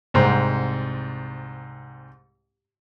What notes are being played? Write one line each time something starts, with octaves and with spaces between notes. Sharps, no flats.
C2 G#2 C4